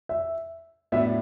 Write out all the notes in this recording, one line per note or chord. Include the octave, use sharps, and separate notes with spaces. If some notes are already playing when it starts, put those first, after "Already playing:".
E5
A2 F#3 B3 D4 E5